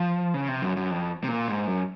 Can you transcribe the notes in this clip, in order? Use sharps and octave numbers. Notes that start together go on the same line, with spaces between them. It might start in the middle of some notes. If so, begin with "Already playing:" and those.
Already playing: F3
C#3
C3
F#2
F#2
F2
C3
A#2
G#2
F#2